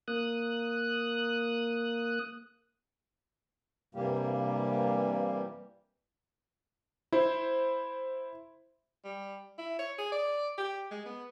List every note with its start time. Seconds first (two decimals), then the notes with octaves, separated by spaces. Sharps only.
0.08 A#3 D#6 F#6
3.95 G2 C3 E3 G3 A#3 G4
7.12 E4 C5
9.04 G3
9.58 E4
9.79 C#5
9.98 G#4
10.12 D5
10.58 G4
10.91 G#3
11.05 B3